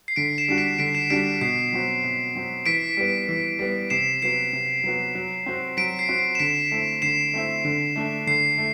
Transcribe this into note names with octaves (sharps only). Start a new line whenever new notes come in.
C7
D3 B6 D7
C7 E7
G3 D4 F#4
B6 D7
D3 B6 D7
C7 E7
G3 D4 F#4 B6 D7
B2 C7
F#3 C4 F#4
B2
F#3 C4 F#4
E3 B6 D7
G3 B3
E3
G3 B3
C3 C7 E7
F#3 B3 F#4 C7 E7
C3
F#3 B3 F#4
F#3
C4 F#4
F#3 B6 D7
C7
C4 F#4
C7
E7
D3 B6 D7
A3 C4 E4
D3 C7 E7
A3 C4 E4
D3
A3 D4
D3 C7
A3